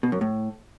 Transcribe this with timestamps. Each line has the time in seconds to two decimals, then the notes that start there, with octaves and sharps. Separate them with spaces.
0.03 B2
0.12 F#2
0.21 A2